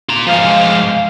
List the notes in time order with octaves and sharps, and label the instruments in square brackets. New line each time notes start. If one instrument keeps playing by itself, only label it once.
[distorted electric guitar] F4 A#5
[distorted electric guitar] F3 G#3 [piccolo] F5